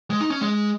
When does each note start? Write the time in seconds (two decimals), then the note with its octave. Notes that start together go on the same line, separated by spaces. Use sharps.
0.10 G#3
0.21 D#4
0.30 C#4
0.41 G#3